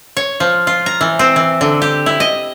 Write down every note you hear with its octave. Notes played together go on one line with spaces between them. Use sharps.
C#5
F3
F4
A#5
E3
C4
E3
D3
G4
E4
D#5